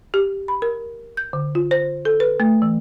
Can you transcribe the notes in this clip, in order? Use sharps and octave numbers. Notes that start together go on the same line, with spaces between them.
G4
B5
A#4
G6
D3
F4
C5
A4
B4
A3
E3